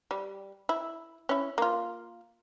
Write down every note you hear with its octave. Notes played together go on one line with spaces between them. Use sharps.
G3
E4
C#4 E4
A#3 F4